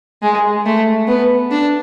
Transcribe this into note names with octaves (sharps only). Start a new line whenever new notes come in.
G#3
A3
B3
D4